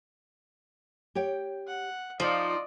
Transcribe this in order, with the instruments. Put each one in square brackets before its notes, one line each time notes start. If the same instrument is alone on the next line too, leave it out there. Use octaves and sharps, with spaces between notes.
[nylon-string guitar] G4 C#5 G5
[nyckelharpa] F#5
[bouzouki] F3 [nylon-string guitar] D#4 [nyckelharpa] D5 D#5